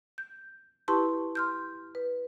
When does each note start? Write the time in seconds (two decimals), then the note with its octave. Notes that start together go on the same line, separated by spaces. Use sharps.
0.18 G6
0.88 E4 G4 B4 A5 C6 C#6
1.35 C6 F6 G6
1.95 B4